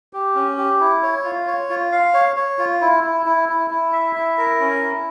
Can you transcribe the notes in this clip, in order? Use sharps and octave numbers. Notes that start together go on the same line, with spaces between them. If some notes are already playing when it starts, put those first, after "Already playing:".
G4
C#4
G4
E4
C#5
F4
C#5
F4
F5
C#5
C#5
F4
E4
E4
E4
E4
E4
E5
E4
A#4
C#4
E4